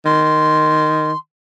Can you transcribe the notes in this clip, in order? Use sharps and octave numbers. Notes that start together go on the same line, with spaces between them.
D#3 C6